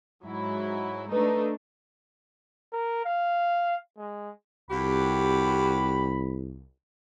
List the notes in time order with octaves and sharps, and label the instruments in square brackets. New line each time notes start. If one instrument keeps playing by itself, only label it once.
[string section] G#2 F#3 E4
[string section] A3 D4 D#4 [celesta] B4
[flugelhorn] A#4
F5
G#3
[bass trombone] C2 [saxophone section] F2 F#4 G4 [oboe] B5